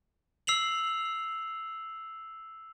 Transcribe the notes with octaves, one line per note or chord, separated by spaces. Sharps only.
E6 C7 F7 F#7